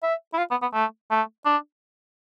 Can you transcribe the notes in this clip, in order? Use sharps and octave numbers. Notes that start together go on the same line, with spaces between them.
E5
E4
F4
B3
B3
A3
A3
D4